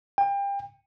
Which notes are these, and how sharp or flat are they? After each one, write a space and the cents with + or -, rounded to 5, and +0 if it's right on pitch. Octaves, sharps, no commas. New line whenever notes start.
G5 +30